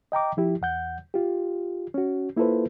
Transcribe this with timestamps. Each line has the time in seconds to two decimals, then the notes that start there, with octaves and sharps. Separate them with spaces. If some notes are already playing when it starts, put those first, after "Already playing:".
0.12 D#5 G5 A#5 D6
0.37 F3 E4 G4
0.61 E2 F#5 G6
1.14 F4 G4
1.94 C#4 F#4
2.37 A#3 E4 F4 A4 B4 C5